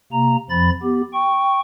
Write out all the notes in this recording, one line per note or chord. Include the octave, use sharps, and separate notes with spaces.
C3 A#3 A#5
F2 F3 B5 A6
B3 G4
G5 C#6